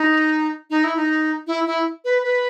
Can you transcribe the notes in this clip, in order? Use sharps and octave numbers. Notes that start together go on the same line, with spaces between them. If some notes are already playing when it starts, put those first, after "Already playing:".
Already playing: D#4
D#4
E4
D#4
E4
E4
B4
B4